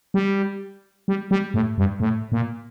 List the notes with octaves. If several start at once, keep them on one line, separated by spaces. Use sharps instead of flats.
G3
G3
G3
A2
G2
A2
A#2